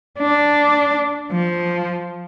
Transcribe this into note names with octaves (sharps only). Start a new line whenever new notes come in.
D4
F3